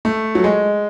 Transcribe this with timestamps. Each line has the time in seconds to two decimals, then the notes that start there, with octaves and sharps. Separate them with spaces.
0.05 A3
0.35 F#3
0.44 G#3